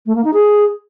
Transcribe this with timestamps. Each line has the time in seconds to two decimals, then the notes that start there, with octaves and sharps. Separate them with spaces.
0.06 A3
0.15 A#3
0.24 D#4
0.34 G#4